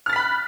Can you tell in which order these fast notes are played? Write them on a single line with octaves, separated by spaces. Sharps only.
F6 A6 B6 B5 F#6